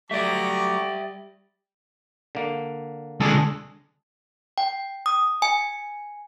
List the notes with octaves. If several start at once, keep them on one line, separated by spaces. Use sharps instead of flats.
F#3 G3 A3 D5 E5 A#5 C#6 D6
D3 A#3
D3 G#3 D4 G#4 A4
G5
D#6
G#5